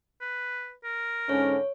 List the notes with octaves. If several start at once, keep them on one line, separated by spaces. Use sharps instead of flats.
B4
A#4
G#2 D3 C#4 C#5